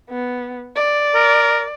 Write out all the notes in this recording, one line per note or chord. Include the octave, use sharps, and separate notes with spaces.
B3
D5
A#4